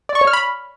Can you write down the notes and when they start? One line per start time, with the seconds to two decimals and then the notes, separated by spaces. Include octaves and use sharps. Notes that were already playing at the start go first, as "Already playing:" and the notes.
0.09 D5
0.15 C#6
0.21 C#5
0.27 F6
0.33 B5